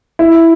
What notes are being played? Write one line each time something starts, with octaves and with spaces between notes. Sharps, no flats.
E4